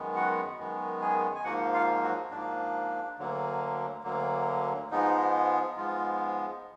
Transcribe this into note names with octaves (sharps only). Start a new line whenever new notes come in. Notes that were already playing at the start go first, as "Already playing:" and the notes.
Already playing: F#2 D#3 G#3 B3
F#4 F#5
F#2 D#3 G#3 B3
G#4 G#5
G#5
G#2 F3 A#3 F#4 F#5
F4 F5
F#3 F#4
G#2 F3 A#3 D4
D2 D3 F#3 A#3
D2 D3 F#3 A#3
G#2 F3 G#3 B3 D#4
G#2 F3 G#3 B3 F4